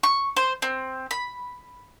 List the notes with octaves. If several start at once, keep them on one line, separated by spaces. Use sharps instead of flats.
C#6
C5
C4
B5